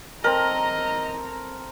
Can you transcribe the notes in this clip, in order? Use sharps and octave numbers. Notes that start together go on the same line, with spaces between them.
C4 A4 A#4 D#5 A#5